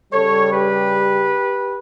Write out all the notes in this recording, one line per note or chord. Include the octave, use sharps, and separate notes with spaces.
C#3 G3 A4 C#5
G4 B4